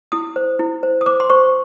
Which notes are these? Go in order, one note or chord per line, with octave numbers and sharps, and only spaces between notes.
E4 D#6
C5
E4
C5
D#6
C5 D6
C6
C5 C#6